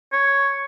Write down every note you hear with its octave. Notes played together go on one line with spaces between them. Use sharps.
C#5